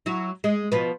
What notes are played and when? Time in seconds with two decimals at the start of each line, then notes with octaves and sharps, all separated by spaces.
0.06 F#3 E4 F#4
0.44 G#3
0.72 B2 F3 B4